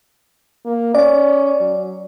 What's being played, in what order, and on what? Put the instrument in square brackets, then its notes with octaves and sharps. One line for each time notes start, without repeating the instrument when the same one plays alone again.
[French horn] A#3
[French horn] C#4 [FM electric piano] D5
[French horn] F#3